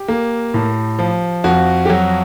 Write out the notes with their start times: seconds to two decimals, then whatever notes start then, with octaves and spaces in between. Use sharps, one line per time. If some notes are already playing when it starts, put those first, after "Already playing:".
Already playing: G4
0.08 A#3
0.54 A2
0.99 F3
1.44 F2 F#4
1.85 G4
1.89 F#3 F#4